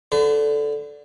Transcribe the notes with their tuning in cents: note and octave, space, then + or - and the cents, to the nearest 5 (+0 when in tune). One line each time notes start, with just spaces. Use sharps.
D3 -10 B4 +45